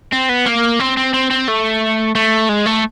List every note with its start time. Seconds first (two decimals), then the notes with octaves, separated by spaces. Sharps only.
0.12 C4
0.29 B3
0.46 A#3
0.80 C4
0.97 C4
1.14 C4
1.31 C4
1.48 A3
2.15 A3
2.49 G#3
2.66 A3